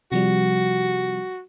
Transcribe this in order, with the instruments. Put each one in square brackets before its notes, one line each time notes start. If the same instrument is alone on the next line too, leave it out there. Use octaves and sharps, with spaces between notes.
[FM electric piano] C3 F3 G3 [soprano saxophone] F#4